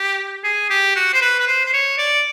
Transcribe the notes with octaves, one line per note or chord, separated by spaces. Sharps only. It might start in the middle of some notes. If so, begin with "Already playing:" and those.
Already playing: G4
G#4
G4
F#4
C5
B4
B4
C5
C5
C#5
D5